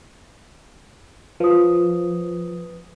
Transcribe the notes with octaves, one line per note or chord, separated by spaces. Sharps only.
F3 B4 D#6